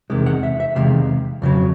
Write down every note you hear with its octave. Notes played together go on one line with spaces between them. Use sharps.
E2 C3 D#3 G#3
F#5
E5
E5
E2 C3 D#3 G#3 F5
F2 C#3 F#3